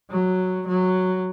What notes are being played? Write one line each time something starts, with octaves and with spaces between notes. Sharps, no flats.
F#3
F#3